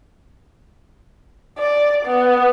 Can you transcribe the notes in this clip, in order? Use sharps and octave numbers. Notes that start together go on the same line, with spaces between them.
D5
B3